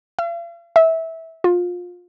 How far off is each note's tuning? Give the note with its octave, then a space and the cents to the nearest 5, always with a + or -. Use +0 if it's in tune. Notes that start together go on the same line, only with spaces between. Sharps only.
F5 -45
E5 -20
F4 +25